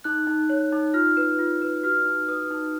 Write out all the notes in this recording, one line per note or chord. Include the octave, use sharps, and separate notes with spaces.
D#4 F#6
D#4
C#5
D#4
F4 F6
B4
F4
B4
F#4 F6
D#4
B4 D#6
D#4